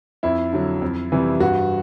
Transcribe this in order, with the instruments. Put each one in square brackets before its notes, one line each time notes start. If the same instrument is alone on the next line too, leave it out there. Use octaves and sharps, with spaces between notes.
[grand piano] F2 E4
D3 F#3
F2
C3 E3 G3
G2 F#4